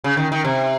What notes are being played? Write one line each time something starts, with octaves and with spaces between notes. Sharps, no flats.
C#3
D#3
D#3
C3